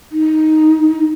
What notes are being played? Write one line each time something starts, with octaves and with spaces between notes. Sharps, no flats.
D#4